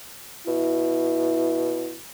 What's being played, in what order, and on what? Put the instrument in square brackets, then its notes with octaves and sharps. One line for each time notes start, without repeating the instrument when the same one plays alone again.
[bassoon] B2 [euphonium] E4